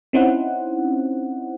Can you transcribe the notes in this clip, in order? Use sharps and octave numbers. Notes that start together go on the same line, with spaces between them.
C4 C#4 D#4 E4 C5 F#5